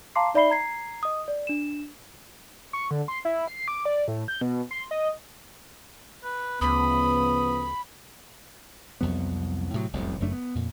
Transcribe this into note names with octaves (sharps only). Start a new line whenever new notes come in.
F5 A5 A#5 C6 D6 C7
D#4 D5 E5 B5 C7 G7
A#5 G#6 C7
D#5 D#6
D5
D4 E7
C#6
D3
C6
E4
C7
D6
D5
A2
G6
B2
C6
D#5
B4
D2 C#3 F3 B3 B5 D#6
C2 F2 F#3 B3
A2 C3 D#3 F#3
F1 C2 F#2 A2
F#1 F#2 A3 D4
B3
F2 A#2